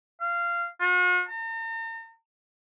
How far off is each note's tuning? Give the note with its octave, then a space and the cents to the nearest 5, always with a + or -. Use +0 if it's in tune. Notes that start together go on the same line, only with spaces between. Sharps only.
F5 -20
F#4 -45
A#5 -45